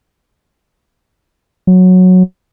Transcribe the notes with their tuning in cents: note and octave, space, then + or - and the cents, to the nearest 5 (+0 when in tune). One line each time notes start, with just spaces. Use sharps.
F#3 -10